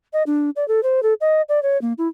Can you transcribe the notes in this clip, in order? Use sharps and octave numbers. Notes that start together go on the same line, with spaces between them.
D#5
D4
D5
A4
C5
A4
D#5
D5
C#5
A#3
E4